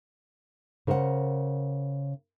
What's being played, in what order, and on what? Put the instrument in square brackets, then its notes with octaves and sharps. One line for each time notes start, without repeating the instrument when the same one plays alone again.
[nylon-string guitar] C#3 A#4 C5 D5 F#5